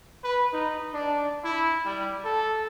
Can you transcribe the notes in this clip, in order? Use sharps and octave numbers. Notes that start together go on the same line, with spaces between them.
B4
D#4
D4
E4
G3
A4